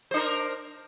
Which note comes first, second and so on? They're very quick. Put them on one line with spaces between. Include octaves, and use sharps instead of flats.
C5 D4 A#4